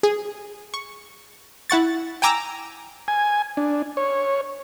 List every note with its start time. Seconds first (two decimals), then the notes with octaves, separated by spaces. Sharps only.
0.03 G#4
0.74 C#6
1.70 E4 F#5 C#6 A6
2.22 G5 G#5 A#5 D6 E6
3.08 G#5
3.57 D4
3.97 C#5